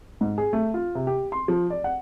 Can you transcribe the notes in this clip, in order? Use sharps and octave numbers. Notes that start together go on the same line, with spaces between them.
G#2
G#4
A3
F4
C3
G4
C6
F3
D5
F#5